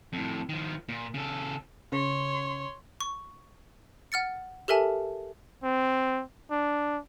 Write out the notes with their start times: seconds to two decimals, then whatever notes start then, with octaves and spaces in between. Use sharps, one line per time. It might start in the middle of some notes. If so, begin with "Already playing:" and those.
0.13 F2 A2
0.49 D#3 F3
0.89 A#2
1.14 C#3 A4
1.92 C#3 C#5 C6
3.01 C#6
4.12 F#5 F6 A6 C#7
4.68 G4 A4 A#4 E5 G#5 A5
5.63 C4
6.51 D4